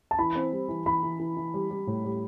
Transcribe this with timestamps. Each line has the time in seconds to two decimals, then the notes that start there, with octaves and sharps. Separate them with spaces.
0.11 A5
0.18 E3 B5
0.35 C4
0.52 G3
0.69 E3
0.86 E3 B5
1.03 E3
1.19 E3
1.37 E3
1.54 G3
1.70 G3
1.87 A2
2.04 G3